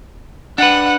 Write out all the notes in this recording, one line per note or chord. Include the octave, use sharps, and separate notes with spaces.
D4 B4 F#5